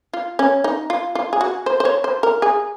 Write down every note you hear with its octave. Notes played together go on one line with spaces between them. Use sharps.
F4
C#4
D#4
F4
F4
G#4
F#4
C5
C5
C#5
C5
A#4
G#4